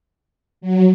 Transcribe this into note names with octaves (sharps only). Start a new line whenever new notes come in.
F#3